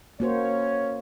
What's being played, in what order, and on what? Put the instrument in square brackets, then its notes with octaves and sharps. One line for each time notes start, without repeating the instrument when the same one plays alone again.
[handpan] A#3 F#4 C5 [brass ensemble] C#4 C#5